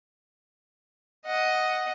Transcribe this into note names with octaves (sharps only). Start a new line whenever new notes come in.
D#5 F#5